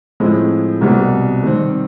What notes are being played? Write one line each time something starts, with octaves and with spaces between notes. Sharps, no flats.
A2 F3 G#3 C4
C2 B2 G3 C4
D#3 G3 C4